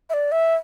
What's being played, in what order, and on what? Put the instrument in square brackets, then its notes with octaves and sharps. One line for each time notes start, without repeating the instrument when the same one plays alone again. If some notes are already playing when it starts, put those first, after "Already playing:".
[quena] E5
D5
E5